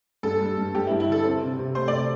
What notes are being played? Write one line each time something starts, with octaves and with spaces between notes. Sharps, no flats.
G2 A4
G3
G2
G2 G4
G2 E4
E4
D3 A4
C4
C3
C3
A3 C5
C3 D5